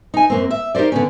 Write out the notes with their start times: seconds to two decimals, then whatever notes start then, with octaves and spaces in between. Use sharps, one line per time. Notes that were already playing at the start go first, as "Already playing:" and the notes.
0.14 D#4 G#5
0.30 F#2 A#3 C4
0.51 E5
0.75 D#4 G4 A#4 C5 D5
0.92 D3 B3 C#4